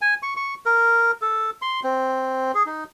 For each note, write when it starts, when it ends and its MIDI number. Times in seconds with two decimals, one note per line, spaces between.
0.01 0.14 80
0.22 0.34 85
0.36 0.54 85
0.66 1.11 70
1.22 1.50 69
1.62 1.80 84
1.84 2.52 60
2.55 2.63 68
2.66 2.84 63